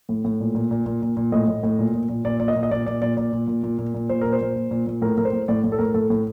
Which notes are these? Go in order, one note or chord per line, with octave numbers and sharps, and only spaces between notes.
A2
A2
A#2
A#2
A#2
A#2
A#2
A#2
A2 D#5
A2
A2
A#2
A#2
A#2
A#2 D5
A#2 D5
D#5
A#2
D#5
A#2 D5
A#2 D5
A#2 D5
A#2 D5
A#2
A#2
A#2
A#2
A#2
A#2 C5
A#2 A#4
C5
A#2
A#2
A#2
A#2
A2 A#4
A2 A#4
C5
A2
A2 D5
A2
A4
A2 A#4
A2 A4
A2